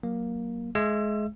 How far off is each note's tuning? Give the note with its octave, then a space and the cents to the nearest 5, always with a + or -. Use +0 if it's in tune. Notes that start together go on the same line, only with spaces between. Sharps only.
F#3 +0 A#3 +10
G#3 +25 E5 +25 E6 +35